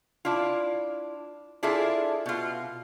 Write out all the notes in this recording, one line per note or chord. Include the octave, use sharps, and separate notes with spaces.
D4 E4 F4
D4 E4 F4 G#4 A4 E5
B2 F4